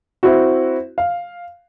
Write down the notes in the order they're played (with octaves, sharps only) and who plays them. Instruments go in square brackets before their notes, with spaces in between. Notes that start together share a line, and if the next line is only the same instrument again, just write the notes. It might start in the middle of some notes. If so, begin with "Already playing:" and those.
[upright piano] C4 E4 F#4
F5